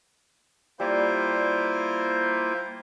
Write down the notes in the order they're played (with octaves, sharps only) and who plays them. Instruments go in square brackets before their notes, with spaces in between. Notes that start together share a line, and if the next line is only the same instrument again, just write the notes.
[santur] G3 [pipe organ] A#3 E4 F4 [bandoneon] C5